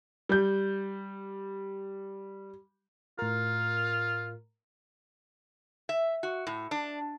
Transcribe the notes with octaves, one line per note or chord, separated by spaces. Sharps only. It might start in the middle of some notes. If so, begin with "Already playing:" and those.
G3 G6
A2 F4 A#4
E5
F#4
A2
D4